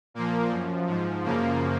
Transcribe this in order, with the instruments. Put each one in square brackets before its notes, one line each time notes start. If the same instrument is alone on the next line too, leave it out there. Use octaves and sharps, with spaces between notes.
[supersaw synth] A#2 F3 A#3
F#2 F3
G#2 F3
F#2 C#3 F3 A#3